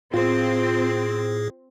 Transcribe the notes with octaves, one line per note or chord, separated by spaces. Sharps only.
A2 C4 F4 G#4